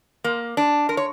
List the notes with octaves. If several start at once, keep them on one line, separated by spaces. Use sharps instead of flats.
A#3
D4
A#4
C#5